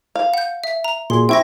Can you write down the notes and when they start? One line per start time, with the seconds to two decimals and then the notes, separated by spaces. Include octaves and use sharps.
0.16 F5
0.34 F#5 G6
0.64 E5
0.84 A#5
1.10 A#2 F#4 G#4 C6
1.29 C4 E4 E5 G5 C#6 A#6